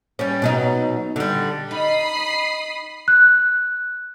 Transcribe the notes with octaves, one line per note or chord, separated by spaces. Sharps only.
G3 C#4
B2 F#3 D#4
D3 G3
D#4 B5 D#6 C7
F#6